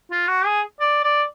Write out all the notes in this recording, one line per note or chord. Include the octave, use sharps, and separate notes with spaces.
F4
F#4
G#4
D5
D5